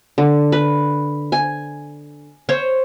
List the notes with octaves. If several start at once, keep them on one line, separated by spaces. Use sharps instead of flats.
D3
B4
G#5
C5 C#5